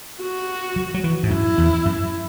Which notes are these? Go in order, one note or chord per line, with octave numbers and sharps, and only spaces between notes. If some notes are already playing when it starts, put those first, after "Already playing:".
F#4
F#3
F#3
E3
G#2
F#2 E4
E2
F#2